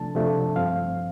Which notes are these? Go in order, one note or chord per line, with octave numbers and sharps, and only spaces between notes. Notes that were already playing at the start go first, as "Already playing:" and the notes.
Already playing: C3 F3 A3 D4 A5
C3 F3 A3 D4
G2 F3 C4 F5